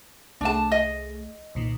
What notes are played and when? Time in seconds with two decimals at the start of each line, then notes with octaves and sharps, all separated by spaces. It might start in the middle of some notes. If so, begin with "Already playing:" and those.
0.41 C2 A3 D4 G#4 A5
0.72 D#5
1.55 C2 A#2 D#3